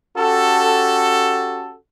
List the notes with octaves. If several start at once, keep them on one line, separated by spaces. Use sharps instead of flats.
C#4 F#4 G4 A4